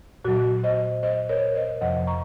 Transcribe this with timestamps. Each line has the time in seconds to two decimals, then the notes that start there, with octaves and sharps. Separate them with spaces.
0.25 A#2 F#3 F#4
0.63 C5 D#5
1.03 C5 D#5
1.29 A#4 C#5
1.55 C5 D#5
1.81 F2 C3 F3 D#5 F#5
2.07 A#5 C#6